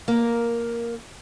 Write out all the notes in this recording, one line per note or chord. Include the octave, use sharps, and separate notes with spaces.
A#3 A#4